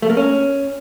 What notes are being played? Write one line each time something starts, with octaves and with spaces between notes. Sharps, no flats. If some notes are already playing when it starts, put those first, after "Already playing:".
A3
A#3
C#4